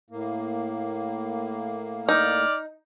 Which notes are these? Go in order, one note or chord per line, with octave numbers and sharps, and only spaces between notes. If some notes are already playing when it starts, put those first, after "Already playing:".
A2 A#3
D#4 D5 F6